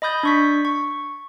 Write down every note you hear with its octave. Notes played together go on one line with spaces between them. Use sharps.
D#5 B5 D#6 G6 A6
D4 C#6 B6
C#6